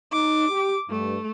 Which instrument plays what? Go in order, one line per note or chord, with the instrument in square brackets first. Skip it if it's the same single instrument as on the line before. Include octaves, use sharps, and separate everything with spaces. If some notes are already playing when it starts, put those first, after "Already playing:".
[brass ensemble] D#4 [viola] D6
[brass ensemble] G4
[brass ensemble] G2 [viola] A3